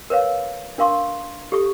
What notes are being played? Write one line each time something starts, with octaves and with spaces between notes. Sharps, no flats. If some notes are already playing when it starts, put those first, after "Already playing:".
A#4 B4 C#5 F5
D4 A#4 F5 C6 C#6
G4 A4 C#6